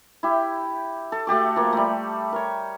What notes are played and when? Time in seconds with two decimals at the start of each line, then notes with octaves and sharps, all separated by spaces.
0.23 E4 G4
1.12 A4
1.27 A3 F#4 G4 D6
1.56 F3 A#3
1.73 G3 A3
2.32 A#4 C#5